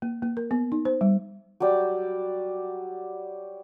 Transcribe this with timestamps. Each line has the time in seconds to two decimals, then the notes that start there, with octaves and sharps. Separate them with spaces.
0.02 A#3
0.23 A#3
0.37 A#4
0.51 B3
0.72 D#4
0.85 C5
1.01 G3
1.60 F#3 G3 D5 G5